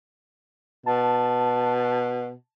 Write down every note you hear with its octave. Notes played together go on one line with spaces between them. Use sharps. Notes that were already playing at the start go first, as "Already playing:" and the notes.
B2 A5